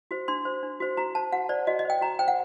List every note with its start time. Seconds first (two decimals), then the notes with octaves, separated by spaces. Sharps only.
0.11 F#4 C5
0.28 D4 C6
0.45 F#4 C5
0.63 D4
0.80 F#4 C5
0.97 F#4 A#5
1.15 C5 A5
1.32 F#4 F#5
1.49 C5 D5
1.67 F#4 D#5
1.79 D#5
1.85 C5 G5
2.01 F#4 A#5
2.19 C5 G5
2.28 F#5